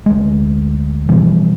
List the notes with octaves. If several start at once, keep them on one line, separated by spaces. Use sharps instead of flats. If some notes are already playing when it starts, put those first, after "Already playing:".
D2 G#3
B2 E3 F3 G3